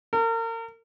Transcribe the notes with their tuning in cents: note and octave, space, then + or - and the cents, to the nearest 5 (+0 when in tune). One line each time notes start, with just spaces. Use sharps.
A#4 -35